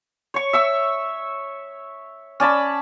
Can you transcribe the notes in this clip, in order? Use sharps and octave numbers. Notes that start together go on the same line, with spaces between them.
C#5 C#6
E5 C#6 E6
C#4 D5 A5 B5